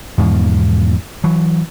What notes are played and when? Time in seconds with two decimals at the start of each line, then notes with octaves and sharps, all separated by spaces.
0.18 E2 G#2 B2 F3
1.24 E3 F#3